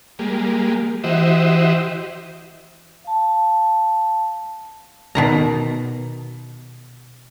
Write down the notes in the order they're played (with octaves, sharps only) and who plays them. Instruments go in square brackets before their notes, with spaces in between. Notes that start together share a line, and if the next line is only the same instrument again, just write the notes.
[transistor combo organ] G3 G#3 A#3
E3 F#4 G4 C5 D#5 E5
[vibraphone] F5 A5
[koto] B2 D#3 A#5